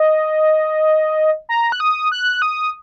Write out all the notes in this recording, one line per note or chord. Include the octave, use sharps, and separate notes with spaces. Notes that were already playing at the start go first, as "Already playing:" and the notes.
Already playing: D#5
A#5
F#6
D#6
F#6
D#6